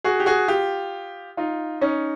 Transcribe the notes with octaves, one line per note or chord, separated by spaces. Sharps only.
F#4 G#4
G4
F#4 G#4
F4 G4
D#4 F4
C#4 D#4